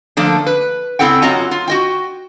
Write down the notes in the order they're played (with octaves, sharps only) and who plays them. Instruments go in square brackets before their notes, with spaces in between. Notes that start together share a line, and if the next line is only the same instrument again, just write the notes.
[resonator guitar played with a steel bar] D3 F3 A3 A#3 D4
B4
C#3 C4 E4 A4 F#5 G5
F#2 F#3 F4 D#5 F#5 A#5
F4
F#4 D#5 G5